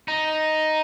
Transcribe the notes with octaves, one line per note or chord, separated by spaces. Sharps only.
D#4